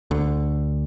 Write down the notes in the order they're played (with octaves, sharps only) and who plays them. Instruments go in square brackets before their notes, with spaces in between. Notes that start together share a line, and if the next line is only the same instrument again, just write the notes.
[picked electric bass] D2 D3